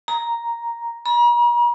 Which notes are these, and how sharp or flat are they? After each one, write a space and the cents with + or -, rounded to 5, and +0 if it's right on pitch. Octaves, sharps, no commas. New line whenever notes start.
A#5 +0
A#5 +45